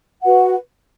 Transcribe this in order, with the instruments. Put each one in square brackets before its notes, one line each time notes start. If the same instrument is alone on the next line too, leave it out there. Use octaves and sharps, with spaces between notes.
[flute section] F#4 B4 F#5